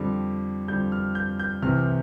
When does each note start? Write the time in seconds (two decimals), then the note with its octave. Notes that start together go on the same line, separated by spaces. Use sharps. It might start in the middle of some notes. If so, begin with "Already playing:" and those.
Already playing: F2 D3 G3
0.68 F2 D3 G3 G6
0.92 F6
1.15 G6
1.39 G6
1.62 C2 C3 E3 F6